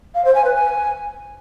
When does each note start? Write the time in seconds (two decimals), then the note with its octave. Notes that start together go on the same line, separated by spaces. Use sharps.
0.15 F5
0.25 C5
0.35 G#5
0.45 B4
0.55 G#5